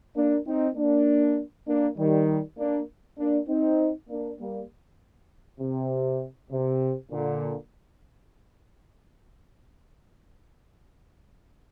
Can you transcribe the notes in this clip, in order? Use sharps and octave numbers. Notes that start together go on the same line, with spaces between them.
A#3 D4
C4 D#4
A#3 D4
A#3 D4
D#3 G3
A#3 D4
A#3 D4
C4 D#4
A#3 D4
G3 A#3
C3
C3
A#2 D3